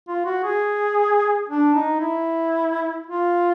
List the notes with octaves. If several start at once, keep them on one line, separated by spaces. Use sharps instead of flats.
F4
F#4
G#4
D4
D#4
E4
F4